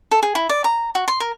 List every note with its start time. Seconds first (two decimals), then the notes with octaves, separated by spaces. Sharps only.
0.11 A4
0.23 G#4
0.35 E4
0.49 D5
0.64 A#5
0.95 F#4
1.08 C6
1.20 A#4